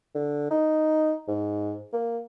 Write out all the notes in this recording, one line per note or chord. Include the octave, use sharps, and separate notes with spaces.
D3
D#4
G#2
A#3